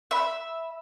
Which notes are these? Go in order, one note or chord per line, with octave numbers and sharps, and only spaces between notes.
E5 B5